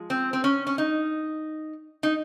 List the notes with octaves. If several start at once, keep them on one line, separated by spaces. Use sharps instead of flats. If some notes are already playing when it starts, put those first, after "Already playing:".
Already playing: F3 G#3
C4
C4
C#4
C#4
D#4
D#4